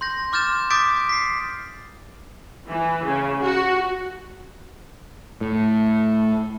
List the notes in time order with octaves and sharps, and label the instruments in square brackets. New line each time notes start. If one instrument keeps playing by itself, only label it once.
[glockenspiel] C6 G6 A#6
C6 D6 F6 G6 A6 E7
D6 D#6 G6 A6 B6 D7
B6 C7
[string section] E3
C#3
F#4
[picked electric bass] A2